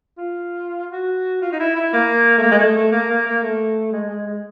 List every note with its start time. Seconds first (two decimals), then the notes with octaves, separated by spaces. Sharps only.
0.18 F4
0.92 F#4
1.42 F4
1.52 D#4
1.60 E4
1.76 E4
1.93 A#3
2.38 A3
2.43 A#3
2.51 G#3
2.59 A3
2.76 A3
2.92 A#3
3.10 A#3
3.26 A#3
3.43 A3
3.93 G#3
4.09 G#3
4.26 G#3